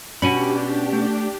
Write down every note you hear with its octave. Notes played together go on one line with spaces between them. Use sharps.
B2 C#4 D4 G4 G#5 B5
A3